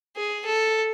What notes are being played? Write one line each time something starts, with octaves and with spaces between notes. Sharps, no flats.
G#4
A4